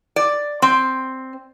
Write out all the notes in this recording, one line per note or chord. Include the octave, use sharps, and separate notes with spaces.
D5
C4